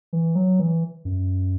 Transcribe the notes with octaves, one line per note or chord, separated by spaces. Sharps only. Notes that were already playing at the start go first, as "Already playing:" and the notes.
E3
F#3
E3
F#2